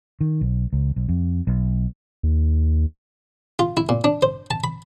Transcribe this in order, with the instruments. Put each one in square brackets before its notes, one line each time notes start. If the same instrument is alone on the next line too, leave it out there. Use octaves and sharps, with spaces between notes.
[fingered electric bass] D#3
B1
C#2
B1
F2
B1
[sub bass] D#2
[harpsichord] F4
E4
A#2
D4
C5
A5
B5